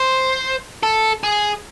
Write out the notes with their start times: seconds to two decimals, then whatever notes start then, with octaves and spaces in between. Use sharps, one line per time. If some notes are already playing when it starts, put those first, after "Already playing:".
Already playing: C5
0.83 A4
1.24 G#4